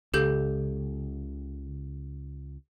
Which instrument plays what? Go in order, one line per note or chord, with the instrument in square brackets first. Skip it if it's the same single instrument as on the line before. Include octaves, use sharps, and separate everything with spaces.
[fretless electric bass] C#2 [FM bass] C#3 [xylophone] G4 A4 G6